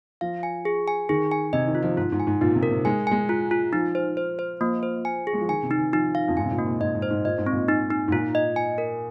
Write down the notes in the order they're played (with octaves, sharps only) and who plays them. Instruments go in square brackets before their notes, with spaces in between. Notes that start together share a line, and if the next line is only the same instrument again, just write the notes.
[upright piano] F3 [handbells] F5
[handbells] G#5
G#4
G#5
[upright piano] D#3 [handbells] G#4
[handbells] G#5
[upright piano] C3 [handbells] D#5
[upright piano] D#3
[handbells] F4
[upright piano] F3
[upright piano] G#2 [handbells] F4
[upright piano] G#2
[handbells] G#5
[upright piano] G#2
[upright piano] A#2 [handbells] D#4
[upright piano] C3
[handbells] A#4
[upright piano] C3
[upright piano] G#3 [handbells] G#5
[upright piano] G#3 [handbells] G#5
[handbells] F4
F4
[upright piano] F3 [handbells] D#4
[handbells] C5
C5
C5
[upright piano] F3 [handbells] A#3
[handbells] C5
G#5
G#4
[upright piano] G#3
F3
[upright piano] D#3 [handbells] G#5
[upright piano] C3
[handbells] D#4
[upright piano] D#3
[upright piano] F3 [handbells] D#4
[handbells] F5
[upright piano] F2
[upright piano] G#2 [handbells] G#5
[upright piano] C3
A#2
[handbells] A#3
[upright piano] A#2
[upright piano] G#2 [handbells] D#5
[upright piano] G#2
[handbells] C5
[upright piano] G#2
[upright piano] A#2 [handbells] D#5
[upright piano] G#2
[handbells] C4
[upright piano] A#2
[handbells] D#4
D#4
[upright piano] G#2
[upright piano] A#2 [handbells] F4
[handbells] D#5
G#5
A#4